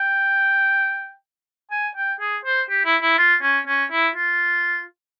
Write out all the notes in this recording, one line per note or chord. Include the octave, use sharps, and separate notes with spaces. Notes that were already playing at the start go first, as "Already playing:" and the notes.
Already playing: G5
G#5
G5
G#4
C5
G4
E4
E4
F4
C#4
C#4
E4
F4